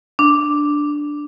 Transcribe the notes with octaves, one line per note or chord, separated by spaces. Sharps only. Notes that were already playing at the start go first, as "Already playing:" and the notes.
D4